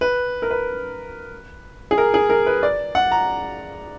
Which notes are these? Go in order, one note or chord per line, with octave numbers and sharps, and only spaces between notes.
B4
A#4
B4
G#4
A#4
G#4
A#4
B4
D5
F#5
A#5